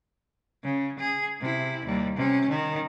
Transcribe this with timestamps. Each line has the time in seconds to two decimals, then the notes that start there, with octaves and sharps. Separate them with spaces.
0.63 C#3
0.99 G#4
1.40 C3 E4
1.85 D#2 G3
2.16 C3 C#4
2.49 D#3